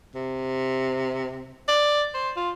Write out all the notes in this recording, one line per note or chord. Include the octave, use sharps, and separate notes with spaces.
C3
D5
C5
F4